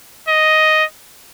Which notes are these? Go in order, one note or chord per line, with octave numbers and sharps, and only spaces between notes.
D#5